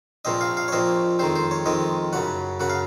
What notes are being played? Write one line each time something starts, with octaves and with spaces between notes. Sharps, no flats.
A#1 A#2 F3 C4 D#5
F5
F5
C#5
A#1 A#2 F3 C4 D#5
F2 D#3 G#3 C4 C5
C5
C#5
F2 D#3 G#3 C4 D#5
F#2 C#3 F#3 F#5
F#2 C#3 F#3 F#5
F5